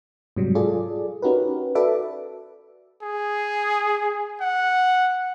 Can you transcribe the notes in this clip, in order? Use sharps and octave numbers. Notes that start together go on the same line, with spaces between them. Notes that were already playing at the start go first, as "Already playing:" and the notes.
G#2 C3 F#3 G3
F4 G#4 A4 D5
C#4 D#4 F#4 G4 A#4 B4
F#4 A4 B4 D5 E5 D6
G#4
F#5